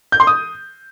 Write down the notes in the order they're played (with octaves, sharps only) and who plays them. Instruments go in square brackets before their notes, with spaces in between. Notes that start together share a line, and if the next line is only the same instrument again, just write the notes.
[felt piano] G6
C6
D#6